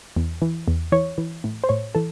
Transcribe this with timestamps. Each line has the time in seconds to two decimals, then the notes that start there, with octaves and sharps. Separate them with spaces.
0.16 E2
0.42 E3
0.68 E2
0.92 E3 C#5
1.18 E3
1.44 A2
1.64 C5
1.69 A2 C#5
1.95 E3 A4